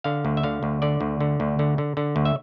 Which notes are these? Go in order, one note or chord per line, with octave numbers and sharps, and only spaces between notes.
D3 F5
D2
E5
D3 F5
D2
D3 D5
D2
D3
D2
D3
D3
D3
D2
E5